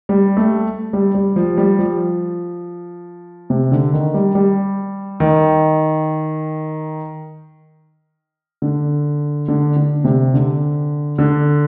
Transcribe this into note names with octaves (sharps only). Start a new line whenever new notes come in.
G3
A3
G3
G3
F3
G3
F3
C3
D3
D#3
G3
G3
D#3
D3
D3
D3
C3
D3
D3